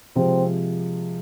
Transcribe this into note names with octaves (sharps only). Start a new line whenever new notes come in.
C3 F3 G#3 C4